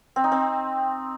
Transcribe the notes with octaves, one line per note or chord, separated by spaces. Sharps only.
C4
D#4
C4